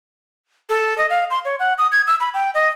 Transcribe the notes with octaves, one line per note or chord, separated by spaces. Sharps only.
A4
D#5
F5
C6
C#5
F#5
D#6
G#6
E6
B5
G5
D#5